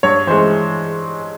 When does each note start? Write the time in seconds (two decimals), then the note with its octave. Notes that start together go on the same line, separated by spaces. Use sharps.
0.03 G2 C#5
0.27 E3 G#3 C5